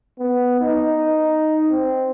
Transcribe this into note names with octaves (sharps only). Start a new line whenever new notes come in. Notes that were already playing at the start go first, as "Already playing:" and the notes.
B3
D#4
C4